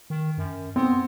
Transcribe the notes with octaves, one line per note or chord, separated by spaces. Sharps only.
D#3
F#2
B3 C4